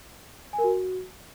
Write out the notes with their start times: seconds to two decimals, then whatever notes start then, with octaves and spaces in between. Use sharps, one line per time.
0.53 G#5
0.58 A#4
0.64 F#4